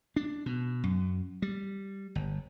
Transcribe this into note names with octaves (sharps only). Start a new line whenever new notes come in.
D4
B2
F#2
G3
G1